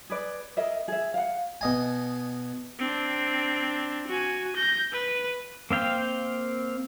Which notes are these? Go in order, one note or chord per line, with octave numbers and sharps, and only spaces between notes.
G#4 B4 D5
G#4 A#4 D#5 E5
G#4 E5
F5 F#5
B2 D#5 G#5
C4 D4
F#4 G#5
G6 A#6
B4
A#3 C4 F5 G5